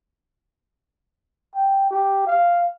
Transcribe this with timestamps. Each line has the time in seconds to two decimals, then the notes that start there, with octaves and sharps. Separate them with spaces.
1.55 G5
1.91 G4
2.27 F5